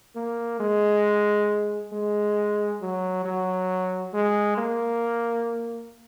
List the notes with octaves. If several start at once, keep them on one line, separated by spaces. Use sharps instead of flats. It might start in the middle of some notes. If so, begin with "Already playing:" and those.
A#3
G#3
G#3
F#3
F#3
G#3
A#3